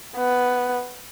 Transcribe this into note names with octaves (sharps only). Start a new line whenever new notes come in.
B3